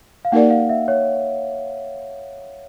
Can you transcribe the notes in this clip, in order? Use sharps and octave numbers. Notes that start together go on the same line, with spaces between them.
F5
A#3 D#4 G4 A#4 D5 F#5
F5
E5
C#5